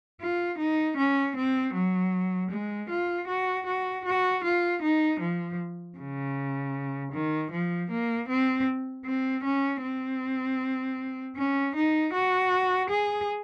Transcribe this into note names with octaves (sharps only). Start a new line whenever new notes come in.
F4
D#4
C#4
C4
F#3
G#3
F4
F#4
F#4
F#4
F4
D#4
F3
C#3
D#3
F3
A#3
C4
C4
C#4
C4
C#4
D#4
F#4
G#4